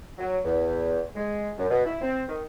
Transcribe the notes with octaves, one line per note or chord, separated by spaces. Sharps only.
F#3
E2
G#3
F#2
B2
E4
C4
D#3